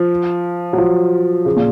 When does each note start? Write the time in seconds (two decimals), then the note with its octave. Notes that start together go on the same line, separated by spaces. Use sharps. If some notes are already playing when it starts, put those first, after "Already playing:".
Already playing: F3
0.73 F#3
0.78 F3
1.45 C#3
1.56 A#2